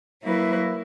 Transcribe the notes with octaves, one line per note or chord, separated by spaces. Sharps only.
F#3 A#3 E4 B4